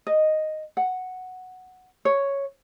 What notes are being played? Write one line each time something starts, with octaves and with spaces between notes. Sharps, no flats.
D#5
F#5
C#5